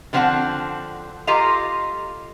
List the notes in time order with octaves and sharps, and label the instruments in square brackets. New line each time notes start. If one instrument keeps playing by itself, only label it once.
[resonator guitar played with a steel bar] D3 F3 B3 C4 F#5 A5
F4 G4 A4 D#5 F5 A#5